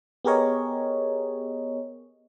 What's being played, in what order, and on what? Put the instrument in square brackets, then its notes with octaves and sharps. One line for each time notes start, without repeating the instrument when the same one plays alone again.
[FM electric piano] B3 G4 G#4 A#4 C#5 D#5